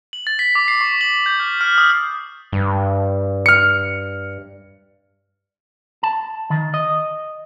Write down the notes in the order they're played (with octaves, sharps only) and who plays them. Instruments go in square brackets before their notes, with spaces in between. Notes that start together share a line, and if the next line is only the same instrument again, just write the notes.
[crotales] F#7
A6
B6
D6
C7
C#6
F#7
G6
F6
F6
D#6
[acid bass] G2
[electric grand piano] F6 C#7
[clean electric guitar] A5
D#3
D#5